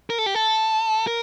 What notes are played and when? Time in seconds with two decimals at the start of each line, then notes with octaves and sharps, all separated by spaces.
0.10 A#4
0.18 A4
0.26 G4
0.35 A4
1.07 A#4